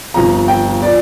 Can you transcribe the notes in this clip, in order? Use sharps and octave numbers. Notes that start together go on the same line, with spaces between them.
G1 F2 F3 A#5
G5
F3 D5